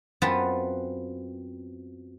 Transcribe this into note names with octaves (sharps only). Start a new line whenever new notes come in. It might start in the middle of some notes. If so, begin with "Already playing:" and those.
F#2 B3 C4 F4 B4 A5